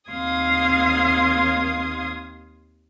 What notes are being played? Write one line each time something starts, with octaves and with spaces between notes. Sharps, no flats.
D#2 C4 F5 C6 D#6 G#6